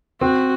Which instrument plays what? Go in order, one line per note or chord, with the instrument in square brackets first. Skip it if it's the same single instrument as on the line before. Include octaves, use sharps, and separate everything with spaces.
[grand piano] C4 [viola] F#4